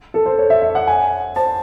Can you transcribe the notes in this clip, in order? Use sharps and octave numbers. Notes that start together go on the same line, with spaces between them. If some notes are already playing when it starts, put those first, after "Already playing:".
A4
C5
C#5
E5
E5
F#5
G#5
C5 A5